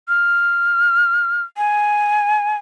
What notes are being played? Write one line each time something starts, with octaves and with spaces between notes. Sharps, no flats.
F6
G#5